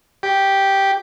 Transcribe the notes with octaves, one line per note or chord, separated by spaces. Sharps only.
G4